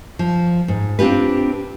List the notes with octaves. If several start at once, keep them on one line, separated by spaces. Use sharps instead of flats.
F3
G#2
C4 D4 F4 G4 B4